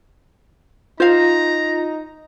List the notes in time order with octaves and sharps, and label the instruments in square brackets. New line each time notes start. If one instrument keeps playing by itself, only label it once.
[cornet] D#4 [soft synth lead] F4 [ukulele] C5 F5 [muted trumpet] A#5